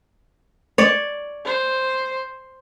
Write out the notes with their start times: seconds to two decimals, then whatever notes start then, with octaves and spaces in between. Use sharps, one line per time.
0.78 C#5 D5
1.46 C5